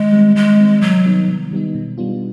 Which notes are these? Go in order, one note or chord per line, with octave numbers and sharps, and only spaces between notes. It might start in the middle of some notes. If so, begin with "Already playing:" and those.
Already playing: D#3 G#3
G3 C4
D#3 G#3
G3 C4
C3 F#3
D#3 G3 B3 D#4
C3
D#3 G3 B3 D#4
B2
G3 B3 D4 F4